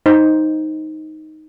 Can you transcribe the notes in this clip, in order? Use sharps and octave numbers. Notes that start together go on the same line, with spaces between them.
D#4 C5